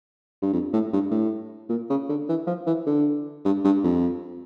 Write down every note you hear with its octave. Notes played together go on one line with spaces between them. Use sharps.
G2
F2
A2
G2
A2
A#2
C#3
D3
E3
F3
E3
D3
G2
G2
F2